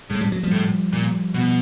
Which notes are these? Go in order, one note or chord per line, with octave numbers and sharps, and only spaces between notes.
A2 G#3
G3
F#3
F3 G3
A2
A#2
B2